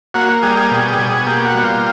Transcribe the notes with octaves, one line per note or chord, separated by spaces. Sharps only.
A#3 F#4
G3 G#4
G#4
B2
B2
A#3 G4
F#4
G3
F4